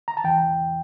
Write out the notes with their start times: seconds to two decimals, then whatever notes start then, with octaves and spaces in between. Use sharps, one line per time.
0.08 A#5
0.17 A5
0.24 E2 E3 G5